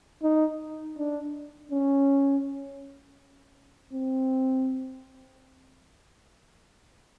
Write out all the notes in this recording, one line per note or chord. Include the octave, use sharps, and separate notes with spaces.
D#4
D4
C#4
C4